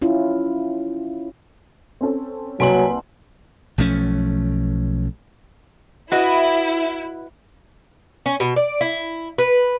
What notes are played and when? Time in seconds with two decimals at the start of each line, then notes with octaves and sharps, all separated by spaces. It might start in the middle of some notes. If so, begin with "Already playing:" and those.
0.02 C#4 E4 F4
2.01 C4 C#4 A4
2.60 C2 F#3 A#3 B4 G#5 C6 F#7
3.78 B1 F3 A3 C#4
6.12 E4 F#4 B4 D#5
8.26 C#4
8.40 B2
8.56 D5
8.81 E4
9.38 B4